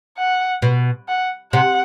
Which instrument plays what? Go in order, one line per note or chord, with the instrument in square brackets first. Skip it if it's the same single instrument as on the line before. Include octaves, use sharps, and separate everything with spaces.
[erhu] F#5
[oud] B2
[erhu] F#5
[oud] C3 [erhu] F#5